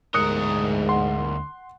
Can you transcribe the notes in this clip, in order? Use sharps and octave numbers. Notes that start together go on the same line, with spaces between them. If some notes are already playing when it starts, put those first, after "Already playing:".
D2 G#2 A#4 D#6 F#6 C#7
F#5 C6